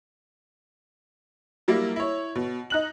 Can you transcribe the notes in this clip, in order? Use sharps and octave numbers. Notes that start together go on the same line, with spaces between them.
F#3 G3 A#3 E4
E4 C#5
B2
D#4 F#6 F#7